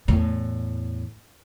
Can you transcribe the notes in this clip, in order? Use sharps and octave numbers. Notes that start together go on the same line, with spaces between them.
E2 A2